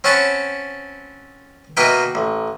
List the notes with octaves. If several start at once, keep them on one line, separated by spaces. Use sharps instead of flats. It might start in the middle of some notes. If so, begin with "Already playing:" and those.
C4 C#4 C#5 F#5 A5 B5
B2 A#3 D#4 B4 E5 G5
A1